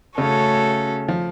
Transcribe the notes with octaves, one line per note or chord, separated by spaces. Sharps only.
C#3 A3 C#4 F#4 A4 C#5
F3